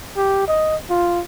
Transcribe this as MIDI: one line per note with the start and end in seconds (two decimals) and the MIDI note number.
0.17 0.44 67
0.48 0.76 75
0.90 1.21 65